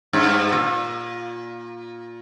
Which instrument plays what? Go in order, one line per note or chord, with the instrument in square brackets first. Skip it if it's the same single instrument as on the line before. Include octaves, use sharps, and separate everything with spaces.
[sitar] G2
A#2